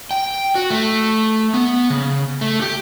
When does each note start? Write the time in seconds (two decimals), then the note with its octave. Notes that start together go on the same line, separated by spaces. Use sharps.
0.11 G5
0.55 F#4
0.70 A3
1.54 B3
1.90 C#3
2.41 A3
2.62 G4